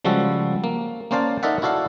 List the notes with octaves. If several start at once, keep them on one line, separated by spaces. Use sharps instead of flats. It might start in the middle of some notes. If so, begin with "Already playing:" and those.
C#3 F3 G3 G#3 F#4 A4
A#3
A#3 C#4 C5 D5 F5 A5
D#4 A4 A#4 D5 E5 F#5
E4 F#4 A4 D5 F5